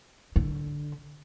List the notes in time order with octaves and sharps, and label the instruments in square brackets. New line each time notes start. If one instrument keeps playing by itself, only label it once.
[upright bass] D3